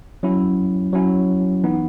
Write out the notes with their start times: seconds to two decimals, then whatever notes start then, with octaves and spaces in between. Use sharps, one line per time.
0.23 F#3 C#4 E4
0.93 F#3 C#4 E4
1.64 E3 B3 D#4